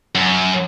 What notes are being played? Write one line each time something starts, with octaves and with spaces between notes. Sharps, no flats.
F#2